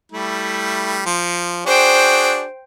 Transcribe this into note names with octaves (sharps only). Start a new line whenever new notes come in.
G3 A3 E4
F3
D4 F#4 G#4 C5 G5